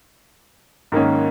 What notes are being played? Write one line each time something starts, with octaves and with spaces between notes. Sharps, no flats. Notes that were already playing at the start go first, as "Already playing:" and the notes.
G#2 D#3 A#3 C#4